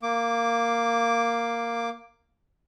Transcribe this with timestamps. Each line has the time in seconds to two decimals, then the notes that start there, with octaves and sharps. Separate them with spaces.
0.03 A#3 D6